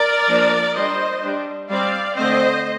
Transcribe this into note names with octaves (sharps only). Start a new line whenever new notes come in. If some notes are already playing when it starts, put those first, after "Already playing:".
Already playing: A#4 D5
F3 A#3 D4
G3 D4 C5 D#5
G3 D4
G3 C4 D5 F5
D3 A3 C4 C5 D#5